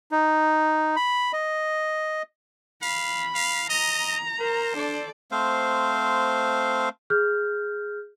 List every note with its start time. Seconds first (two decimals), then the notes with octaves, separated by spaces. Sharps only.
0.12 D#4
0.96 B5
1.33 D#5
2.82 F5 B5
3.35 F5
3.69 D#5 A#5
4.40 A#4 C5
4.75 D4 A4 D5
5.31 A3 C4 C5 F5
7.10 G#4 F6 G6